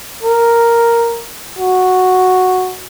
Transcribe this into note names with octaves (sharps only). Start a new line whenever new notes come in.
A#4
F#4